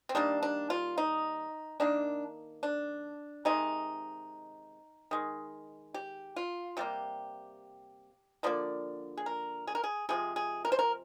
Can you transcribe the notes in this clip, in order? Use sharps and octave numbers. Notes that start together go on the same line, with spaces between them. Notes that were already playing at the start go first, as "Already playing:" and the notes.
C4
D#3 G3 A#3 D4
D4
F4
D#4
D#3 A#3 D4
D4
C3 D#3 G#3 D#4
D#3 G#3
G4
F4
C3 G3 A#3 G4
D3 F3 A#3 D5
G#4
A#4
G#4
A#4
G#4
C3 F3 G#3 G#4
G#4
A#4
C5
A#4